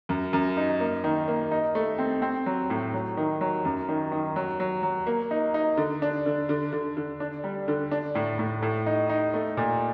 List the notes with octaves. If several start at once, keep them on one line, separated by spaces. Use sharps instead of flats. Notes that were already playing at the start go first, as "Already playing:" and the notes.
F#2
F#2
D#4
A#3
D#3
A#3
D#4
A3
C4
C4
F#3
A2
F#3
D#3
F#3
F#2
D#3
D#3
F#3
F#3
F#3
A#3
D#4
D#4
D3
D4
D3
D3
D3
D3
D4
G3
D3
D4
A2
A2
A2
D#4
D#4
A3
A#2